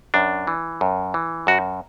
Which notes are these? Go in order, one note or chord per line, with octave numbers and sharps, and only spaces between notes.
F#2 D4
E3
F#2
E3
F#2 F#4